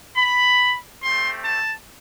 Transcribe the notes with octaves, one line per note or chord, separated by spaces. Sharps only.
B5
A3 C4 G4 C6
A5